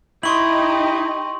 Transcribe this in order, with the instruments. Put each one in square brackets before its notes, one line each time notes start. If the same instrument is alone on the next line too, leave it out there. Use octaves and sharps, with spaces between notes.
[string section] D#4 G4 D#5 [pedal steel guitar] E4 [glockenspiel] C6 C#6 F#7